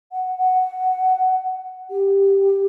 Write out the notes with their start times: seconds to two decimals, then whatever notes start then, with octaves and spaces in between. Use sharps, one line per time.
0.12 F#5
0.38 F#5
1.90 G4